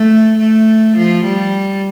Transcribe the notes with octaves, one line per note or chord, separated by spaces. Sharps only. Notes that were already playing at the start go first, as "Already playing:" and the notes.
Already playing: A3
A3
F3
G3